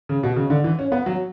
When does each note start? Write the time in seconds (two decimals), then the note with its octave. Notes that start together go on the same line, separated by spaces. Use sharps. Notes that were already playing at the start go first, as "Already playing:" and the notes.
0.09 C#3
0.23 B2
0.36 C#3
0.50 D3
0.64 E3
0.79 C#4
0.92 B3
1.06 F#3